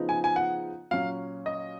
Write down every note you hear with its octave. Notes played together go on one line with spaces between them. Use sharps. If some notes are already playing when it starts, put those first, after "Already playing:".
Already playing: C#3 F3 B3 D#4
G#5
G#5
F#5
A#2 F#3 C#4 F5
D#5